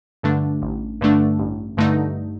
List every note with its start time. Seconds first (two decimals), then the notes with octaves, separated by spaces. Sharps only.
0.23 G2 D3 A3 D4
0.62 A1
1.01 G2 D3 A3 D4
1.39 A1
1.77 G2 D3 A3 D#4